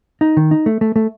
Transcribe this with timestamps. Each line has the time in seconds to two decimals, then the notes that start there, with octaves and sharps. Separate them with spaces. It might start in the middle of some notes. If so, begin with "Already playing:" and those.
0.21 D#4
0.37 D#3
0.51 D#4
0.66 A3
0.81 A3
0.96 A3